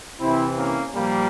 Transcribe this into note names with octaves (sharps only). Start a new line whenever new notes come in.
C3 E3 C4 E4
A#3 C#4
A#2 F3 G3 A#3